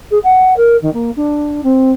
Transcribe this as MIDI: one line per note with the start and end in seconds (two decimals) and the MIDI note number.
0.10 0.18 68
0.23 0.53 78
0.56 0.76 70
0.82 0.92 51
0.93 1.10 58
1.16 1.60 62
1.63 1.91 60